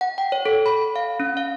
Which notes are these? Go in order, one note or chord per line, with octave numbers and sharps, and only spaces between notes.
F#5
G5
C#5
A4
B5
F5
C#4
F5